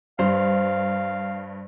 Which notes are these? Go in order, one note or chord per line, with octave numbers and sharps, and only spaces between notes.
G2 C5 F5